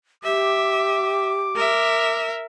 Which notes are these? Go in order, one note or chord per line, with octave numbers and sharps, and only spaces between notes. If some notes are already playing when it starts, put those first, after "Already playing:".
G4 E5 D6
A#4 E5